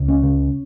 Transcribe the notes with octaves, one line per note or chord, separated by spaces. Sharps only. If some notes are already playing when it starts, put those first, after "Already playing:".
Already playing: C#2
C#4
C#3